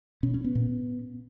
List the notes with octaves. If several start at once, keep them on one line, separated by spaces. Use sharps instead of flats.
B2 C#4
C#4
B3
A#2